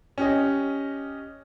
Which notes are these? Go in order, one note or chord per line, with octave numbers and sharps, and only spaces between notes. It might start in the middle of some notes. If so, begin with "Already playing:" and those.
C#4 G4 D#5